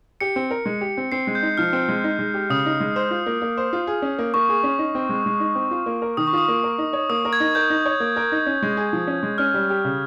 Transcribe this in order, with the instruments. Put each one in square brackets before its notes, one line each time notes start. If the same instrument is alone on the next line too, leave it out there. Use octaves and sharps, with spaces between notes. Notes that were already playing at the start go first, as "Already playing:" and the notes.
[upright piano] G4 [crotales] C#7
[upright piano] C4
A#4
G#3
G4
C4
[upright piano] C4 [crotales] C7
[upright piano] G#3
[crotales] G6
[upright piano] D#4
[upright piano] F3 [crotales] F6
[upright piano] C4
G#3
D#4
G#3
G4
[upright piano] C#3 [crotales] D#6
[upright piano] D#4
G#3
C5
F4
A#3
A#3
C5
F4
G#4
C#4
A#3
[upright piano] A#3 [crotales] C#6
[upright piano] G#4
C#4
D#4
C4
G#3
G#3
D#4
C4
F4
A#3
A#4
[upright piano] D#3 [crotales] D#6
[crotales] C#6
[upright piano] F4 [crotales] D#6
[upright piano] A#3
A#4
D#4
C#5
[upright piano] A#3 [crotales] D#6
[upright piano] A#4
[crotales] G#6
[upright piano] D#4
[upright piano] A#4 [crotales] G6
[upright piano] D#4
C#5
A#3
A#4
D#4
C#4
G#3
G#4
F3
C#4
G#3
[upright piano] C#4 [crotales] F6
[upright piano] G3
G4
C#3